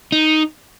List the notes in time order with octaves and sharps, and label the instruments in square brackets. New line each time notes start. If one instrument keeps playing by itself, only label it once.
[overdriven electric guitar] D#4